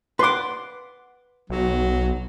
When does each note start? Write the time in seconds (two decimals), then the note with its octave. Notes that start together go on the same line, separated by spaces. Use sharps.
0.19 B4 F#5 C6 D6
1.50 B1 F#3